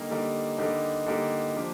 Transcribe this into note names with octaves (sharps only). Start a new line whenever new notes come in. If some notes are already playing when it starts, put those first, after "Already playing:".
Already playing: D3 G3 A#3 D#4 G4
D3 G3 A#3 D#4 G4
D3 G3 A#3 D#4 G4
D3 G3 A#3 D#4 G4
F3 A#3 D4 G4